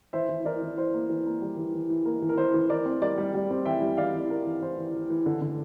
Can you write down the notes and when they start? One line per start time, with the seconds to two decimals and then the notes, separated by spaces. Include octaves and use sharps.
0.13 E3 C5 E5
0.29 E3
0.45 E3 A#4 D5
0.62 E3
0.78 E3 C5
0.94 A#3
1.10 E3
1.26 A#3
1.42 G3
1.57 E3
1.74 E3
1.90 E3
2.05 A#3 A#4
2.22 E3
2.29 A#4
2.37 E3 C5
2.54 E3
2.70 E3 A#4 D5
2.85 C4
3.01 G3 A#4 D5
3.18 G3
3.34 G3
3.50 C4
3.65 E3 E5 G5
3.82 G3
3.97 E3 D5 F5
4.14 E3
4.30 E3 A#4
4.46 E3
4.62 E3 C5
4.78 E3
4.94 E3
5.10 E3
5.26 D3
5.41 D3